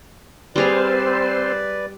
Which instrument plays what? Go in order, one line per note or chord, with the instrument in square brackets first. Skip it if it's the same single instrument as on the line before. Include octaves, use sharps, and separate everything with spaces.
[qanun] G3 G#4 F5 [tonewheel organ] C4 C5 [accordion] B4 D5